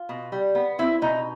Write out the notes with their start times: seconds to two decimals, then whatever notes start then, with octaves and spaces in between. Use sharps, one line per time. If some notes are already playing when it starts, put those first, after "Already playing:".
Already playing: F4
0.09 B2
0.32 G3
0.55 B3
0.79 C4 E4
1.02 B2 D#4